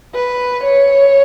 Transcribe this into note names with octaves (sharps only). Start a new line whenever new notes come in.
B4
C#5